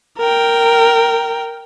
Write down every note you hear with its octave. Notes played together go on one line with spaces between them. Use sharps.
A#4 G5